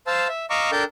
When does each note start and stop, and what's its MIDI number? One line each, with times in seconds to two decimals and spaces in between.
0.07 0.28 72
0.07 0.28 77
0.07 0.28 81
0.07 0.28 88
0.29 0.46 76
0.50 0.71 75
0.50 0.71 77
0.50 0.71 82
0.50 0.71 85
0.50 0.71 86
0.50 0.71 88
0.72 0.84 62
0.72 0.84 69
0.72 0.84 70
0.72 0.84 79
0.72 0.84 81
0.72 0.84 91